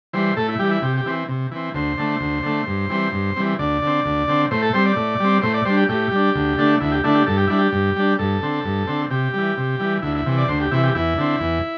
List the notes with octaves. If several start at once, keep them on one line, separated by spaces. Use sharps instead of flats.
E3 G3 C5
A2 A4
E4
E3 G3 G4
E4
C3 G4
G4
E3 C4
C3
E3 C4
D2 C5
D3 A3
D2
D3 A3
G2
E3 G3 C4
G2
E3 G3 C4
D2 D5
D3 C4
D2
D3 C4
A2 C5
A4
G3 C4 C5
D5
A2
G3 C4
A2 C5
D5
G3 D4 C5
G4
A2 G4
G3 D4
D2
D3 A3 D4
D2 E4
G4
D3 A3 D4 E4
G4
G2 A4
G4
G3 D4 E4
G4
G2
G3 D4
G2 A4
D3 C4
G2
D3 C4
C3 G4
E3 G3
C3
E3 G3
D2 E4
E4
C3 E3
D5
D2 C5
G4
C3 E3 E4
G4
E2 E4
D3 C4
E2